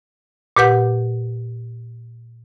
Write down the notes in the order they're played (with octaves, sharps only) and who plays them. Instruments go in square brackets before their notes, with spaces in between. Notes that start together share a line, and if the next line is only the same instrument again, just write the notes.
[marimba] A#2 G4 B4 F#5 G6